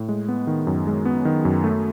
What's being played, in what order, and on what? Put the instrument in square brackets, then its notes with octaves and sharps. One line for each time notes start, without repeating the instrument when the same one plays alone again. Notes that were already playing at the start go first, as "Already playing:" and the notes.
Already playing: [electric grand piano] A2
G#3
B3
D#3
F#2
G#3
B3
D#3
F#2
A3